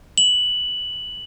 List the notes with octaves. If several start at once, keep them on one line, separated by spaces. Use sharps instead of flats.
F#7